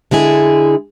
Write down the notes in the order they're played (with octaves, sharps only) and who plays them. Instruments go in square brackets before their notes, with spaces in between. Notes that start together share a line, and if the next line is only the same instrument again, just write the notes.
[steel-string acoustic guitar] D3 G#3 E4 G#4